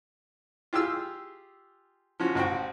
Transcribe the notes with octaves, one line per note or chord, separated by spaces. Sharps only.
F4 G4 G#4 E6 F6
F3 C#4 F#4
A1 F#4 C5 G5